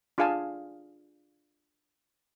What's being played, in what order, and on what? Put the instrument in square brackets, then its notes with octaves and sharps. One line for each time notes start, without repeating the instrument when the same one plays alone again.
[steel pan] D4 F4 G#4 F5 G#5 A5